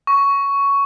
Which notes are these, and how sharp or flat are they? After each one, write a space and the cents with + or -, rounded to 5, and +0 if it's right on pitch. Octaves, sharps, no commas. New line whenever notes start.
C#6 +10